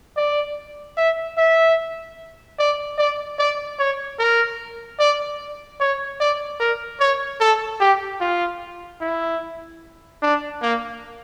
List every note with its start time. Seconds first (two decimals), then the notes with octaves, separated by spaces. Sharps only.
0.17 D5
0.97 E5
1.38 E5
2.59 D5
2.98 D5
3.39 D5
3.79 C#5
4.19 A#4
5.00 D5
5.80 C#5
6.20 D5
6.60 A#4
7.00 C#5
7.40 A4
7.80 G4
8.21 F4
9.01 E4
10.22 D4
10.62 A#3